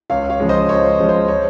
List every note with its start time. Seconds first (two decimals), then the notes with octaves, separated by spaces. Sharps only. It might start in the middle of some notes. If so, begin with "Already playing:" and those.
0.10 C#2 C#5 F5
0.30 C#5 F5
0.40 C#3 F3 G#3
0.49 C5 D#5
0.69 C#2 C#5
0.99 C#3 F3 G#3
1.09 C5
1.28 C#5